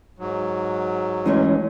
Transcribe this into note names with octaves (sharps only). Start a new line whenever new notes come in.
G#2 F#3
E3 G#3 A3 C#4 C#5